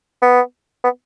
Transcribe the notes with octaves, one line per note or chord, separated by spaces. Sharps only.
B3
B3